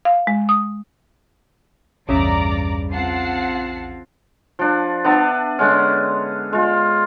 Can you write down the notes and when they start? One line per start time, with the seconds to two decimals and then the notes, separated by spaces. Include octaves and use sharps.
0.05 F5
0.27 G#3
0.49 D#6
2.09 A#1 E2 G2 C#3 D5 E5 A#5 D6
2.92 C4 F4 F#5 A5 C7
4.59 F3 D4
5.04 B3 D4 E5 A5
5.59 D3 G#3 C#4
6.53 G#3 F4